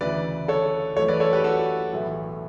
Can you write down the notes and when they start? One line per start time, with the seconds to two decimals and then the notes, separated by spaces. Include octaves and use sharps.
0.01 D2 C#3 E3 B4 D5
0.48 A4 C#5
0.96 F#2 E3 A3 A4 C#5
1.08 B4 D5
1.20 A4 C#5
1.33 G4 B4
1.44 F#4 A4
1.92 B1 A2 E3 A3